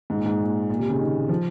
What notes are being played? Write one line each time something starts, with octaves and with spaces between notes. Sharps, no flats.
G#2
A#2
G#2
A#2
A#2
C3
C#3
D#3
F3